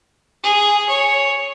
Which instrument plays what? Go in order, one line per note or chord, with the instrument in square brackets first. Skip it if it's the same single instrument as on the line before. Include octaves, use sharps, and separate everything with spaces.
[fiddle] G#4
C#5